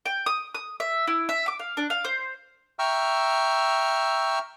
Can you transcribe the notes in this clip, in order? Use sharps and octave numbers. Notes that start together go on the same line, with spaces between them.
G5
D#6
D#6
E5
E4
E5
D6
F5
D4
F5
C5
E5 G5 A#5 C#6 E6 F6